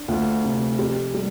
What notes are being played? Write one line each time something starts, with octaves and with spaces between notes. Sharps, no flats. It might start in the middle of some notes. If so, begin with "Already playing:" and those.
Already playing: D4
D2 F4
C3
F2 G4
G3